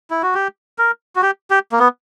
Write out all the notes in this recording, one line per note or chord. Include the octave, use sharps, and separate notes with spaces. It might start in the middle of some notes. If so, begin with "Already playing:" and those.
E4
F#4
G4
A#4
F#4
G4
G4
A#3
B3